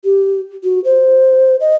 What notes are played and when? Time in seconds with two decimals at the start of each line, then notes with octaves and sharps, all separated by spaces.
0.04 G4
0.64 F#4
0.85 C5
1.61 D#5